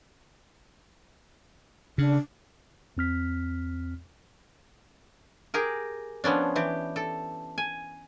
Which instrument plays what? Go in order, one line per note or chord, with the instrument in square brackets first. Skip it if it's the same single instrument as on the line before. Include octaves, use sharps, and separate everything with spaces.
[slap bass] C#3 [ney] D4
[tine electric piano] E2 C4 F6 B6
[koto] G4 G#4 A#4
F3 B3 C#4 D4
E3 G4
A4
G#5